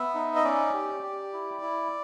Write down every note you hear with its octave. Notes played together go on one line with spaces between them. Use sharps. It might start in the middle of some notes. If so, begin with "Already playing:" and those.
Already playing: B3 E5
D#4
D#5
C#4 D5
G4
G4
E4
E4